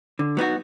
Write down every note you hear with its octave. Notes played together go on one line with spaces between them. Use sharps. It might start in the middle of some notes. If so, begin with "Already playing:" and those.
D3
F#3 B3 D#4 F#4